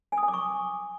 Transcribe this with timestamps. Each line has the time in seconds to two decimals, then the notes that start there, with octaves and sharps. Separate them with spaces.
0.12 G#5
0.18 D#6
0.23 G#5
0.28 D6
0.33 C#6